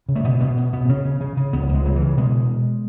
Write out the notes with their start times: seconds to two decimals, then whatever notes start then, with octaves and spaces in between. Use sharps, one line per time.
0.09 C#3
0.15 A3
0.24 B2 B3
0.40 B2 B3
0.57 B2
0.73 B2 B3
0.89 C#3 C#4
1.05 C#3
1.21 C#3
1.37 C#3
1.53 C#2 B3
1.69 C#2
1.74 G#3
1.85 C#3 F#3
1.96 E3
2.01 C#3
2.17 B2 G#3